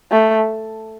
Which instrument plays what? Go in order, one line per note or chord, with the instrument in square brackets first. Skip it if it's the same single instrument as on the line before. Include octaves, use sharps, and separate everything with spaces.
[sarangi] A3